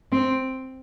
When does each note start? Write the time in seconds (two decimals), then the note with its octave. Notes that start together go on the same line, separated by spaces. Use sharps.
0.12 C4